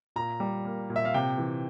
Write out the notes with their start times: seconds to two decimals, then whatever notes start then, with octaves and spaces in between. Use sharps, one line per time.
0.16 A#2 A#5
0.40 G3
0.65 A#3
0.90 A#2
0.96 E5
1.05 F5
1.14 C3 G5
1.38 E3